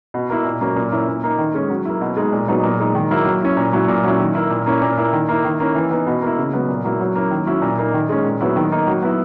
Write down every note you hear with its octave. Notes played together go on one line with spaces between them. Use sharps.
B2
A#3 E4
A#2
F#3 A#3 C#4
A#2
A#3 C#4 E4
A#2
A#3 D#4
D#3
G#3 C#4
F#3
A#3 E4
B2
G#3 D#4
A#2
F#3 B3 D#4
A#2
G#3 D#4
D#3
F#3 A#3 E4
F#3
C#4 E4
A#2
F#3 C#4 E4
A#2
F#3 C#4 E4
D#3
A#3 E4
A#2
A#3 C#4 E4
A#2
A#3 E4
D#3
A#3 E4
D#3
A#3 C#4 E4
E3
B3 D#4
B2
A#3 E4
C#3
F#3 B3
A#2
F#3 A#3 E4
F#3
A#3 C#4 E4
D#3
F#3 C#4 E4
A#2
A#3 D#4
D#3
G#3 C#4
A#2
F#3 B3 E4
D#3
A#3 D#4
F#3
B3 E4